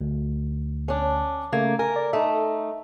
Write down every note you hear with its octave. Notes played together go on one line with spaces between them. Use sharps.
D2
C#4 D4
C#3 A3 A#3 G#6
A#4 G#5
D5
A3 D#4 E5